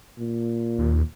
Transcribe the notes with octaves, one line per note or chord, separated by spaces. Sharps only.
A#2
D#2